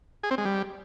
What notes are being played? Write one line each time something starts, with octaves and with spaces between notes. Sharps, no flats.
G#4
C4
G#3
G3